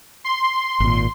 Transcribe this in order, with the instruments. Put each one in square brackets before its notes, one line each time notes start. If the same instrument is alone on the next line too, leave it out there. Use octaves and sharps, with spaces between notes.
[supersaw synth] C6
[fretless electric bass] G#1 A#2